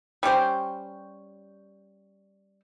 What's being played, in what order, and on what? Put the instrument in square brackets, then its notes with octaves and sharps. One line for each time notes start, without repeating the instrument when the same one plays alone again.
[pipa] G3 C#4 G4 C5